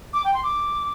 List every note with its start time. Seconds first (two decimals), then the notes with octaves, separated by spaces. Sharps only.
0.13 D6
0.24 G5
0.34 C6
0.43 D6